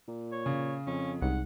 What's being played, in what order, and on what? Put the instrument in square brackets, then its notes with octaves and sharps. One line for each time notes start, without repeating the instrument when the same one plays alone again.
[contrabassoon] A#2
[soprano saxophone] C#5
[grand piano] C#3
[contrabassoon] F2 [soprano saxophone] C#4
[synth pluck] C2 [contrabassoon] G#2 [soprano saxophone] F#5